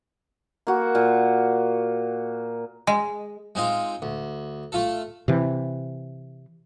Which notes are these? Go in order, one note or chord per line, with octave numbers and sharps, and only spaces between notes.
A#3 F#4
A#2
G#3
G#3 C4 D#4 F4
D2
A3 F4 A4
C3 E3